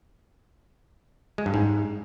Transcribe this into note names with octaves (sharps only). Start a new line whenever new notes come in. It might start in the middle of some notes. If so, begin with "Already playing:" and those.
G#3
G2
G#2